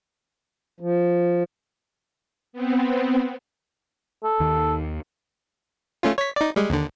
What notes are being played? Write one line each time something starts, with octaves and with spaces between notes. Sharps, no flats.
F3
B3 C4
A4
D#2 D#3
A3 C#4 F4
C#5 B6
D#4 D5
G3 G#3
D#2 D3